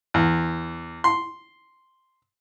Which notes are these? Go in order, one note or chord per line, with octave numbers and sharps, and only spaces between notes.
E2
C6